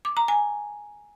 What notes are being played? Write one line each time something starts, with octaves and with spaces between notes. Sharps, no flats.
D6
A#5
G#5